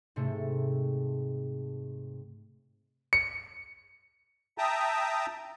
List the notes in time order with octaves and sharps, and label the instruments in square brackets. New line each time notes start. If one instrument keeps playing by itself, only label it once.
[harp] G#2 C3 A3
[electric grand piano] C#7
[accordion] E5 G5 A5 A#5 D#6